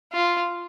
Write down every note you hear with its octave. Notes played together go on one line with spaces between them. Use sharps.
F4